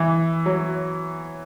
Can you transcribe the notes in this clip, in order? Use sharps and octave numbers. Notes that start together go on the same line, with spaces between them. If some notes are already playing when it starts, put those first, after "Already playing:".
Already playing: E3
F#3